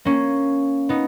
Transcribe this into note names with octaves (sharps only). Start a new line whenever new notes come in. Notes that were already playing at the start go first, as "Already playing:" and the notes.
A#3 C#4
B3 D#4